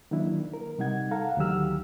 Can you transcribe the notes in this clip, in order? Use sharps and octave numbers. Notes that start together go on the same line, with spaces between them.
D#3 F#3 A#3 D4 E4
A#4
C3 G3 D#4 F#5 G#6
A4 F5 F#5 A#5
D2 D#3 F#3 G4 E6 F6